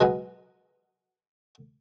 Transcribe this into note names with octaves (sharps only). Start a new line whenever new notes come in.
B2 F#3 G#3 B3